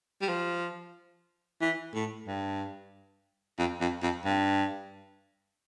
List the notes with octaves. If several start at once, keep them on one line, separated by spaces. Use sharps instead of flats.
G3
F3
E3
A2
G2
F2
F2
F2
G2